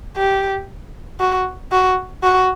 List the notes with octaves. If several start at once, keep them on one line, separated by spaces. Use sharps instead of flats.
G4
F#4
F#4
F#4